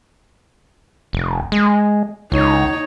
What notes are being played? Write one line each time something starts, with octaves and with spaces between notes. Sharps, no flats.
F1
G#3
C#2 D#4 C#5